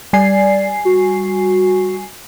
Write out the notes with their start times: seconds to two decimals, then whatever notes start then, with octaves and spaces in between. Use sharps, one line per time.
0.13 G3 D5 G#5 C7
0.85 F#4